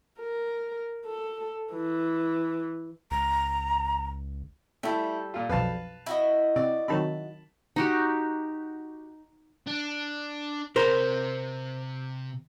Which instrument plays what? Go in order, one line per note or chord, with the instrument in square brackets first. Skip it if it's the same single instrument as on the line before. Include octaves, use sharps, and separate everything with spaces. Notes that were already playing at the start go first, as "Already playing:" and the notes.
[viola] A#4
A4
E3
[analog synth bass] C#2 [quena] A#5
[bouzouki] G3 A4 [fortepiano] A3 E4
[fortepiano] A#2 F4
[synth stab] B1 F2 [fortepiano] B4 F5 A5
[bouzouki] E4 F#4 D#5
[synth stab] C3 [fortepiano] D5
[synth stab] C3 D#3 F#3 [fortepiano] A5 B5
[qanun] D#4 F#4 G4
[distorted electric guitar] D4
[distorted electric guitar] C3 [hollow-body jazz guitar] A#4 C5